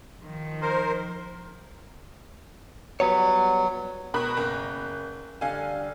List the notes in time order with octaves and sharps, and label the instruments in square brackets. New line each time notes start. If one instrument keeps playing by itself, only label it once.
[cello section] D#3 F3
[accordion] A#4 C5
[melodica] F#3 [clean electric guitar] G3 B3 C#5
[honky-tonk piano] B2 B5 F#6 [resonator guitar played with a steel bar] A#4 B4
[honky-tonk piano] F#1
[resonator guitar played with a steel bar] D3 G3 [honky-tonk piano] F5 G#5